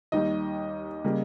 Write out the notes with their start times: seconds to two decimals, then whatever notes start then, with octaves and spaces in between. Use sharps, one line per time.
0.12 D#2 D#3 G3 D#5
1.04 C#3 G3 A#3